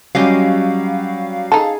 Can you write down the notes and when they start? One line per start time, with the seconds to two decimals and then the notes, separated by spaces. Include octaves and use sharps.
0.15 F#3 G3 C#4 G4 D#5 F5
1.52 D#4 G#4 A4